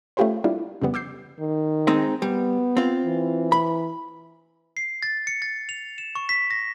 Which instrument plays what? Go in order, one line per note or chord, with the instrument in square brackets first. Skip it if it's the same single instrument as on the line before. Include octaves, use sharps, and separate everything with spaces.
[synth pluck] A3 C#4 F4 G4 B4 C5
G3 A#3 D4 E4 F4
F2 C#3 G3 B3
D6 E6 G6 C7
[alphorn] D#3
[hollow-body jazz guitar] G#3 C4 D#4
[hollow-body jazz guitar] G3 [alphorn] B3
[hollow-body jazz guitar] C4 F4
[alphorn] E3
[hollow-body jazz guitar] B5
[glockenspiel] C7
A6
C#7
A6
F7
E7
C#6
B6
A#6